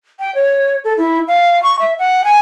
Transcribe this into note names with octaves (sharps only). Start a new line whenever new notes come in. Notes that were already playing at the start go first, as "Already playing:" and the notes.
G5
C#5
A4
E4
F5
C#6
E5
F#5
G#5